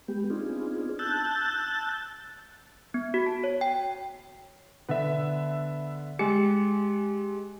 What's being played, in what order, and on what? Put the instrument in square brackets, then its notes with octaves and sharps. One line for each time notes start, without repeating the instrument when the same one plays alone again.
[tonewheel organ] G#3 B3 G4
B3 C4 D4 D#4 F4 G#4
A5 E6 F#6 G6 A6
[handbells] B3
F#4
A5
C#5
G5
[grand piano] D3 B3 [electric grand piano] B4 E5
[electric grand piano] G#3 C#7 [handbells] G4 [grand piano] G#5